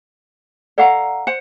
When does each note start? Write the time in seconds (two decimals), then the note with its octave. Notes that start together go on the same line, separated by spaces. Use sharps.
0.78 A4 D5 F5 F#5 A#5 C#6
1.27 C5 F#5